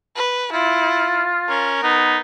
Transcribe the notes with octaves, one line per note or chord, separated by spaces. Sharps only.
B4
E4 F4
C#4 A#4
B3 D#4